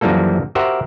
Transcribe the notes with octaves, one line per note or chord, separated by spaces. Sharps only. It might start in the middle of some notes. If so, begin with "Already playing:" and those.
F#2 E3 F3 G3 A#3 A4
F#4 G4 A#4 C5 E5 F#5